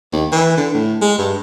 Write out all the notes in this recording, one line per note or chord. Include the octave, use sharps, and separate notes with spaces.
D#2
E3
D3
A2
G#3
G2